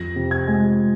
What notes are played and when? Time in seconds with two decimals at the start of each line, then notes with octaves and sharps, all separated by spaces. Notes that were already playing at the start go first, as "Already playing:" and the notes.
Already playing: F2 A#6
0.16 C3
0.31 G#6
0.48 G#3